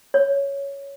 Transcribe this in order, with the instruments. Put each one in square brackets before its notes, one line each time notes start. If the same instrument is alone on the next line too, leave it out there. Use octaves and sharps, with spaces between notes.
[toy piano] C#5